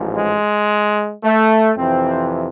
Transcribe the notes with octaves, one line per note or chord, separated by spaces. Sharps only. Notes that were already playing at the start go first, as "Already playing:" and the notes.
Already playing: A1 G#2 F3
G#3
A3
F2 C3 E3 C4